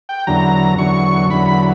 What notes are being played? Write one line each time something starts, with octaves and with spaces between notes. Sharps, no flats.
G5
E2 D3 F#3 A#5
E2 D3 F#3 C#6
E2 D3 F#3 B5
B5